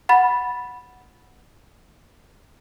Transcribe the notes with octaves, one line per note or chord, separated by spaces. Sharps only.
F#5 B5 A6